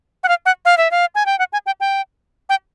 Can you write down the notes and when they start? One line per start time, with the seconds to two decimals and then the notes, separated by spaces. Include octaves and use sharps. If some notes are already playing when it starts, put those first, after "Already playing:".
0.24 F#5
0.28 F5
0.46 F#5
0.65 F5
0.78 E5
0.91 F5
1.15 G#5
1.26 G5
1.39 F#5
1.53 G#5
1.66 G5
1.80 G5
2.49 G5